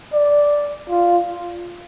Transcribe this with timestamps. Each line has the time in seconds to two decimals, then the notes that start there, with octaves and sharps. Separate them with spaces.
0.13 D5
0.90 F4